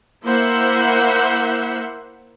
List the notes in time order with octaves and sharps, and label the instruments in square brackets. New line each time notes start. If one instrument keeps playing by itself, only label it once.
[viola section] A#3 E4 C5 E5 F#5